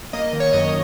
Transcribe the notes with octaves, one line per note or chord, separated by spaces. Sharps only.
A#3 D#5
D#5
D#3
C#5
F#2 D#5